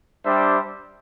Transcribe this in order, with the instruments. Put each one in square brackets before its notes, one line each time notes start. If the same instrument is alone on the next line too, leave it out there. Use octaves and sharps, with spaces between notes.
[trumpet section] G3 D4 G4 C5 E5